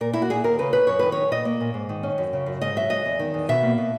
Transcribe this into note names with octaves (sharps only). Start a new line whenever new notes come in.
A#2 A#4
A#3 E4
F#4
A#2 G#4
D#2 A#4
C#3 B4
C#4 B4
F#2 C#5
D#3 B4
C#4 C#5
A#2 D#5
A#3
A#2
G#2
D#3
C#4
F#2
C#3
F#2
G#2 D#5
F#3 E5
G#2 D#5
E2
D#3
E2
B2 E5
A#3
B2